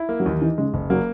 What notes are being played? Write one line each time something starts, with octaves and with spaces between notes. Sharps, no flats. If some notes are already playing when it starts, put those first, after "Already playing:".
Already playing: E4
A#3
F#3
D#2 E3
E3 D#4
C#3 G#3
F#1
F#3 A#3